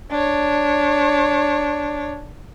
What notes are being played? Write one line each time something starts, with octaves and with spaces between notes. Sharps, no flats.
D4 C#5